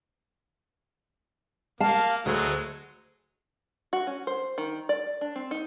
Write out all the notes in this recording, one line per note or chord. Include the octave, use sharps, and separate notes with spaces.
A#3 F5 A5
D2 F#3 G#3 A3
F#4
C#4
C5
D#3
D5
D4
C4
D#4